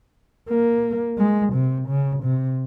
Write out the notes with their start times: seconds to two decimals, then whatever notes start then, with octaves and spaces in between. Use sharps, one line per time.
0.49 A#3
1.18 G#3
1.54 C3
1.89 C#3
2.23 C3